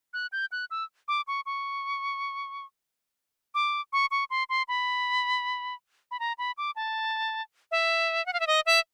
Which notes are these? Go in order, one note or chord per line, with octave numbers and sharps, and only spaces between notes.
F#6
G6
F#6
E6
D6
C#6
C#6
D6
C#6
C#6
C6
C6
B5
B5
A#5
B5
D6
A5
E5
F#5
F5
E5
D#5
E5